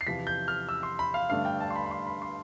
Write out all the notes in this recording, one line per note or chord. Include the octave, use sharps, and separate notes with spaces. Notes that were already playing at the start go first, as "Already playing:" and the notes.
C7
E2 C3 F3 B6
G6
F6
E6
C6
B5
F5
G2 D3 A3 D4 F5
G5
A5
C6
B5
B5
C6
B5
C6